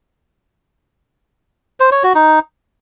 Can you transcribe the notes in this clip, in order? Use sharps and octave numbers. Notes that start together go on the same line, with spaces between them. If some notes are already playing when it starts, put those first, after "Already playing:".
C5
C#5
F#4
D#4